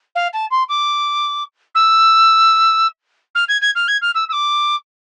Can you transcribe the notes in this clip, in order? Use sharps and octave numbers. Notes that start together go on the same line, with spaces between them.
F5
A5
C6
D6
E6
F6
G#6
G#6
F6
G#6
F6
E6
E6
D6